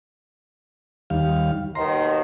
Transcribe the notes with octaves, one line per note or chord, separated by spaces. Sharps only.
D#2 G3 F5
D#2 B2 D#3 A#5 C6